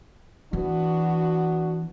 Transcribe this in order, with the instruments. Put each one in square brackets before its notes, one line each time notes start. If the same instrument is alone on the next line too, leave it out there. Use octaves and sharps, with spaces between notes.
[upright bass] E3 [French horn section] B3 D4 F#4